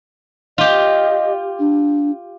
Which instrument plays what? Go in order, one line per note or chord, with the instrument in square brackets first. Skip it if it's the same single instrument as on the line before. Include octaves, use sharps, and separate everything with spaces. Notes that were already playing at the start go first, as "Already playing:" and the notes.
[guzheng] F4 G4 [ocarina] D#5
[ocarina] D4